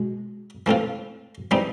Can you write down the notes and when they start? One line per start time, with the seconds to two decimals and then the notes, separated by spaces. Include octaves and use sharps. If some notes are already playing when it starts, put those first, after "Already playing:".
Already playing: B2 G#3
0.66 E3 A3 C4 F4
1.51 E3 G3 C4 D#4